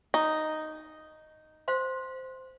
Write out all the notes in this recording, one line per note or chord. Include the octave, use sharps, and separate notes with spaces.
D#4
C5 F5 C6